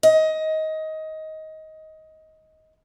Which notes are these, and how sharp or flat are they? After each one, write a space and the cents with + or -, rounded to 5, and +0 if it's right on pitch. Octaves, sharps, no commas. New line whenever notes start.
D#5 +15